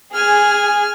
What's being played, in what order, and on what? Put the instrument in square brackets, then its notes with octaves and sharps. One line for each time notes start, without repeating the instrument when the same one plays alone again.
[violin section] G#4 [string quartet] G#5 F6